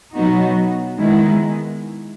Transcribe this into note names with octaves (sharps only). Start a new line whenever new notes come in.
B2 F#3 B3 D#4 F#4
D#3 G#3 B3 E4